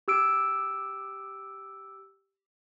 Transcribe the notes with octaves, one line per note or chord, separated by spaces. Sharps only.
G4 E6 D7